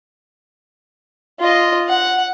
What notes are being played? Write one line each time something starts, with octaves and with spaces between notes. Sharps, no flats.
F4 D#5
F#5